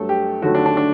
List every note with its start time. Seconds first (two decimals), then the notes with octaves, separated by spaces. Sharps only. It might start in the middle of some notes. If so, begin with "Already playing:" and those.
Already playing: G2 F#3 A3 A4
0.09 G4
0.42 D#2 D3 F#3 A3 F#4
0.55 D4
0.66 D4
0.77 D4